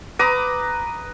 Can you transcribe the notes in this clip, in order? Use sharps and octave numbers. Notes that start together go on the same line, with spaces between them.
B4 A#5 D6 D#6